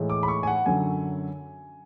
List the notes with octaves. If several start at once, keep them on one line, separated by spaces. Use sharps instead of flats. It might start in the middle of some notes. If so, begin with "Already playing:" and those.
Already playing: A2 E3 G#3
D6
B5
C#6
G#5
F#5
F#2 D3 F#3 G#5